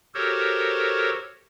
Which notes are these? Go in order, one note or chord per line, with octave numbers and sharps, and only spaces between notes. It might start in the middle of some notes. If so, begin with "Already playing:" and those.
F#4 G4 A4 A#4 C5 C#5